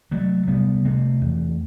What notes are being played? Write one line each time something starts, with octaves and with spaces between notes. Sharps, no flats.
C3 F#3 A3
C3 G3 B3
C3 A3 C4
E2